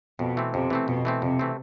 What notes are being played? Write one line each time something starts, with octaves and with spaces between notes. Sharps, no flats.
F2 B2
E3 A3 C4
F2 C3
E3 A3 C4
F2 B2
E3 A3 C4
F2 C3
E3 A3 C4